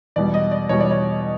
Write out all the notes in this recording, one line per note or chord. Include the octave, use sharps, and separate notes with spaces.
E2 B2 G3 D5
D#5
D5
E2 B2 G3 C#5
D5
C#5